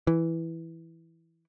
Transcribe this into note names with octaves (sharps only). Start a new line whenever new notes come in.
E3